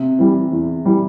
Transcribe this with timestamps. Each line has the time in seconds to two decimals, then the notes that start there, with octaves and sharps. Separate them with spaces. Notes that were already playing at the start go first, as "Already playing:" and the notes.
Already playing: C3
0.19 E3 G3
0.52 E2
0.85 E3 G3